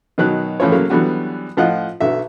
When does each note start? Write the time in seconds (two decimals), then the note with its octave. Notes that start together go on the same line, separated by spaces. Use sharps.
0.18 B2 D#3 F#3 F#6
0.60 A2 E3 F3 C#4 C#5
0.72 C#3 F#3 A3 A#3
0.90 D3 E3 F#3 G3 B3 F#4
1.57 A2 F3 F4 D#5 F#5 F#6
2.01 B1 D3 F#4 E5